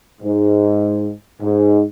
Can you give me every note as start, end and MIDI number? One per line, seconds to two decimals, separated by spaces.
0.22 1.11 44
1.41 1.83 44